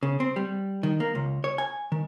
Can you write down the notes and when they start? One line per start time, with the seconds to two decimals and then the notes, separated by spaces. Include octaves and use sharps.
0.03 C#3
0.20 C4
0.36 G3
0.83 D#3
1.00 A#3
1.15 C#2
1.44 C#5
1.58 G#5
1.92 D#3